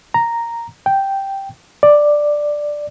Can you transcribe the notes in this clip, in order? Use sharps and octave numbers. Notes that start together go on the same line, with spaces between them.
A#5
G5
D5